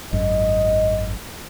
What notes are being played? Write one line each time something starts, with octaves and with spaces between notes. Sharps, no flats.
G#1 F#2 D#5